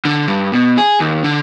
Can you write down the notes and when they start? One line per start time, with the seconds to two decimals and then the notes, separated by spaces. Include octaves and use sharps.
0.05 D3
0.28 G2
0.52 B2
0.78 G#4
1.00 D#2
1.24 D3